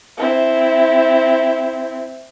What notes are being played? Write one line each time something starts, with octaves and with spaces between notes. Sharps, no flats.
C4 E4